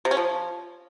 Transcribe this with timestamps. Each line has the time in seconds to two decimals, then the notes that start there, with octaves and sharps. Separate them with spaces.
0.05 C3
0.11 C#4
0.17 F3